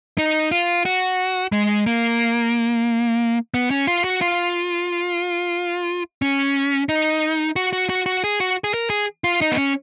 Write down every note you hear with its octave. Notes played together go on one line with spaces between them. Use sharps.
D#4
F4
F#4
G#3
A#3
B3
C#4
F4
F#4
F4
C#4
D#4
F#4
F#4
F#4
F#4
G#4
F#4
G#4
A#4
G#4
F4
D#4
B3
C#4